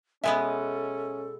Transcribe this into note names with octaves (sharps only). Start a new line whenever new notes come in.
B2 G#3 B3 C#4 A4 E5 G#5